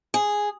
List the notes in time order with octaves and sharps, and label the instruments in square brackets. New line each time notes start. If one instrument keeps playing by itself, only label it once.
[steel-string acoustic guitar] G#4